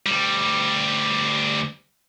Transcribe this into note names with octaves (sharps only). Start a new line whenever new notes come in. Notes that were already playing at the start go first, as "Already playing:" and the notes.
D2 G3